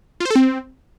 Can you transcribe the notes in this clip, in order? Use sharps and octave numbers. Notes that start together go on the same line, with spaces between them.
F4
C5
A4
C4